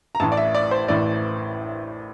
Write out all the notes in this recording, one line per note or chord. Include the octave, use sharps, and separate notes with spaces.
A#5
A1 A2 E3 A5
D5
E5
D5
C5
A1 A2 E3 D5